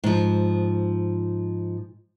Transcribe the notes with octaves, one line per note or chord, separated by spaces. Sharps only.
G#2 F3